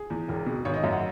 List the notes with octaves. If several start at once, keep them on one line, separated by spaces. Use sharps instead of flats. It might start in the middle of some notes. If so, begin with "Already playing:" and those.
Already playing: G#4
E2
E1
B2
G#1 C#5
D#5
F#2 E5
F#5